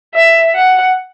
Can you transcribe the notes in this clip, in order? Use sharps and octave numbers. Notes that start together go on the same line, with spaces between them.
E5
F#5